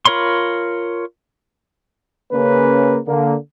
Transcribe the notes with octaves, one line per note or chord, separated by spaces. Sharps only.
F4 A#4 C#5 B5 C6
C#3 A#3 C#4 B4
D3 A#3